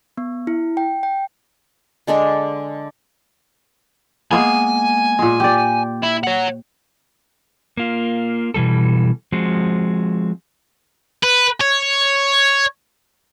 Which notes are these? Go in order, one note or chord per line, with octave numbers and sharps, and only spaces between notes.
B3
E4
G5
G5
D3 G#3 D4 D5
G#3 A#3 B3 G#5
A#2 G#3
G4 D5
E4
C#5 F#5
A#3 F4
B2 E3 G3 A4
F3 G#3 C4 F#4
B4
C#5